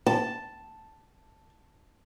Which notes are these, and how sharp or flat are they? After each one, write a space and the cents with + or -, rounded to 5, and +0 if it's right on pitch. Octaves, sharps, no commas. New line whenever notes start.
A5 +0